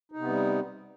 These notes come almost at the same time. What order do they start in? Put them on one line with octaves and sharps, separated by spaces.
D#4 C3 B3 G3